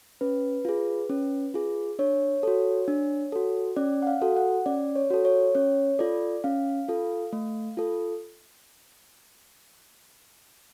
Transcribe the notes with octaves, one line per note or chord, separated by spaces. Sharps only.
C#4 B4
F4 G#4
C#4
F4 G#4
D4 C#5
F#4 A4
D4
F#4 A4
C#4 D5
F#5
F5
F#4 A4
F#5
C#4 D5
C#5
F#4 A4
C#5
C#4 C#5
F4 A4 D5
C#4 F5
F4 A4
A3
F4 A4